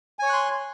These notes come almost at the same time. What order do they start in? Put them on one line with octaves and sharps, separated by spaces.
G#5 C#5 C#6 F#6 C6